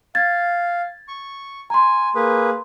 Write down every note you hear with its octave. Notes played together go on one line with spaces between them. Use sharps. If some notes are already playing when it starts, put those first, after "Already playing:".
F5 G#6 A6
C#6
G#5 A#5 C6
A#3 G#4 B4